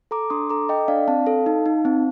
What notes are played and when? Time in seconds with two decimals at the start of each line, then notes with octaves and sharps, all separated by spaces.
0.11 A4 A#5 D6
0.30 D4 C6 D#6
0.50 A4 A#5 D6
0.69 A4 D#5 G5
0.88 D4 D5 F5
1.08 C4 F5 A5
1.27 A4
1.46 D#4
1.66 D#4
1.85 C4